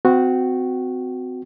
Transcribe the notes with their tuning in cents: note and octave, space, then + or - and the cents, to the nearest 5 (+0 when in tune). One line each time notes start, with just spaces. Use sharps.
C4 -35 F#4 -10 G5 -25